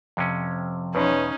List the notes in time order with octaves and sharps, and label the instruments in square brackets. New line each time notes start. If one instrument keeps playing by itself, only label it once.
[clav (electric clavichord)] F2 C3 C#4 [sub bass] F3
[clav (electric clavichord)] E2 B2 [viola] C#4 D#4 [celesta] B4 C#5 C6